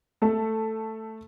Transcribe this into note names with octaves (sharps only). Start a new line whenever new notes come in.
A3 A4